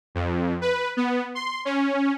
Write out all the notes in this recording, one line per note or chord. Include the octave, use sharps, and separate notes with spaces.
F2
B4
B3
C6
C#4